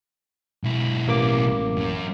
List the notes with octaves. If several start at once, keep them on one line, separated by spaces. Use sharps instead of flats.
B1 E4
A1 A#3 D6
F#2 C#4